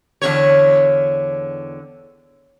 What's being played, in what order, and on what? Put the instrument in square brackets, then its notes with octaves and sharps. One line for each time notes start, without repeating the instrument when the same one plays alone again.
[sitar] E2 D3 C#5